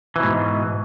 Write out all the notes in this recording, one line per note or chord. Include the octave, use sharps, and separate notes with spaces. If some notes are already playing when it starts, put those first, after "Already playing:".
G#2 B2 E3